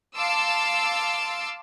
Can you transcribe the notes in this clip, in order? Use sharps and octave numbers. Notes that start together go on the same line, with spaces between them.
F5 A5 C6 D6 E6